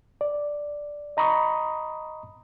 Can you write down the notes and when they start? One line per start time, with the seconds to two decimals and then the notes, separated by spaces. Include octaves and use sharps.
0.21 D5
1.17 D#5 A#5 B5 C#6 D#6